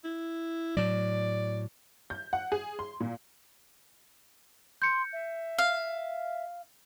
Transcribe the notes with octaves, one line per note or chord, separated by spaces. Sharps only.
E4
A2 F#3 D5
G6
F#5
G#4
C6
A#2
C6 G6 C#7
E5
F5